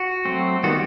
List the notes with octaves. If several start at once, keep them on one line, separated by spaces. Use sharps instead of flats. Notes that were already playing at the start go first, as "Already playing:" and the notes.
Already playing: F#4
F#3 A3 C4
D#3 G3 B3 F#4